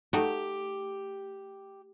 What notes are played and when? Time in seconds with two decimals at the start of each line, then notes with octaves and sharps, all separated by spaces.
0.13 A3 D#4 F#4 G4